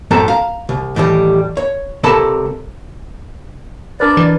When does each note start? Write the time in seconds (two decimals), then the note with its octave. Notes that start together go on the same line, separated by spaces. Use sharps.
0.11 F#2 A2 C4 A4 A5 A#5
0.28 F5 A#5
0.69 C2
0.96 A2 D#3 E3 G3
1.57 C#5
2.03 C#2 C3 A4 A#4 A5 B5
4.00 D4 A#4 B4 D5
4.17 E3